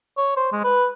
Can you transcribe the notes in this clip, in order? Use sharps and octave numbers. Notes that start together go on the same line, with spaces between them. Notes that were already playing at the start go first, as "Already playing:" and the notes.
C#5
C5
G#3
B4